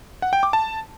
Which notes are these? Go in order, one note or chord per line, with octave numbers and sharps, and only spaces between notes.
F#5
G5
D6
A5